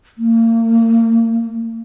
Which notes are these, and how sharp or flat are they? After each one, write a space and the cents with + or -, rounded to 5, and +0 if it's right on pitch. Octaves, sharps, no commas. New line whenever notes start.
A#3 -35